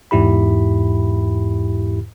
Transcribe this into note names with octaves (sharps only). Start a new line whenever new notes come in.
E2 G#2 E4 G4 B5